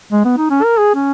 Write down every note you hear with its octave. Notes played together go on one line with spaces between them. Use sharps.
G#3
B3
D#4
C#4
A#4
G#4
C#4